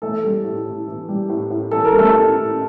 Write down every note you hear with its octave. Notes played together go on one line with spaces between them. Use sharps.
E3 A3 A4
G3
A2
A2
E3
G3
A2
A2
E3 A4
A#4
G3
A3 A4
A2
A2